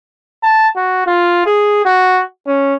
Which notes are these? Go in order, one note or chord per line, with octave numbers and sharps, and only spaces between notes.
A5
F#4
F4
G#4
F#4
C#4